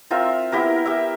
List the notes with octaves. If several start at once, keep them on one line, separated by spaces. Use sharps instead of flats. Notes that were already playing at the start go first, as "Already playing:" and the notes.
C4 F4 A#4 E5
B3 E4 G4 A#4
G4 E5